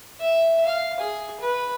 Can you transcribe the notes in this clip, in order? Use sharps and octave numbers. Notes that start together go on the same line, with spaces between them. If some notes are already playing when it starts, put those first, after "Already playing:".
E5
F5
G#4
B4